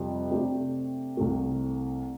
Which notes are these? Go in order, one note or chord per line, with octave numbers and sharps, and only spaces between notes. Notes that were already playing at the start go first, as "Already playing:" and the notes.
Already playing: F2 C3 G3
C3 A3 D4 G4
C2 C3 A3